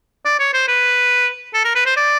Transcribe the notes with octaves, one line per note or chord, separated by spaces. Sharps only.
D5
C#5
C5
B4
A4
A#4
B4
C5
D5